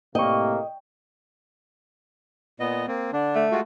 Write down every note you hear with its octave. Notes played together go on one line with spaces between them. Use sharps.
A2 C3 A#3 D#5 G5 C#6
A#2 B3 D#5
A#3 C4
D3 D4
A3
G#3 F4 F#4